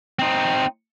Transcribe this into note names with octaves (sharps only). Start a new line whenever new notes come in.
C4 D#4